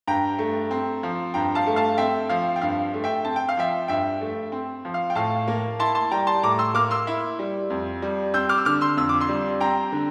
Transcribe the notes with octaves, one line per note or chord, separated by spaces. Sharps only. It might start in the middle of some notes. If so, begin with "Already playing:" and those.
G2 G5 A#5
A3
C4
F3
G2 G5 A#5
F5 A5
A3
F5 A5
C4 E5 G5
F3 F5
G5
G2 F5
A3
E5 G5
C4 A5
G5
F5
F3 E5 G5
G2 E5 G5
A3
C4
F3
F5
G5
A2 F5 A5
A#3
E4 A5 C6
A5 C6
G3 G5 A#5
A5 C6
A2 A#5 D6
C6 E6
A#3 D6 F6
C6 E6
E4
G3
F2
G3
C4 E6 G6
D6 F6
E6
D3 D6 F6
C6 E6
F2 E6
D6
C6 E6
G3
C4 G5 A#5
D3